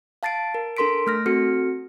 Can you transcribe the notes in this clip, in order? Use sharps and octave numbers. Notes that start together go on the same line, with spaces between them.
F5 A5 A6 C7 D7
A#4
D4 A4 A#4 C6 B6 D7
A3 F6 A#6
C4 F#4 A4 F6 C#7